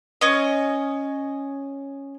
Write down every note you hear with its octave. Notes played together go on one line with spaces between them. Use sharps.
C#4 D#5